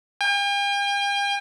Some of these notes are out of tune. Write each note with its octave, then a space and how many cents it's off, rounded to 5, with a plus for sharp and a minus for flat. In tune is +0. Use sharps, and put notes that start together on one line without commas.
G5 +45